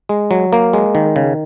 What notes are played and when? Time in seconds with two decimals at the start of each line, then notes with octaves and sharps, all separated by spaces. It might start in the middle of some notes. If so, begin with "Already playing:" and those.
0.09 G#3
0.31 F#3
0.53 A#3
0.73 G#3
0.95 D#3
1.16 C#3